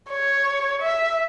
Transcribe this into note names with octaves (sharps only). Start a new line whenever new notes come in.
C#5
E5